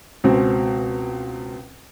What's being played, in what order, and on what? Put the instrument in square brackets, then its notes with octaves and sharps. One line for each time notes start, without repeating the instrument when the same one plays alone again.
[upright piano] C#2 B2 C4